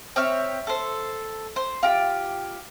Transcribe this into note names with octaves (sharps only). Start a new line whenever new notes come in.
C4 C#5 E5 F6
A4 C5
C5
F4 G4